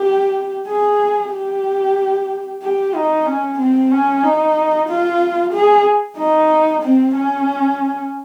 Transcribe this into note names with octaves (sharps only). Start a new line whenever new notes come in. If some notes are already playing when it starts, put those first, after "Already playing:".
Already playing: G4
G#4
G4
G4
D#4
C#4
C4
C#4
D#4
F4
G#4
D#4
C4
C#4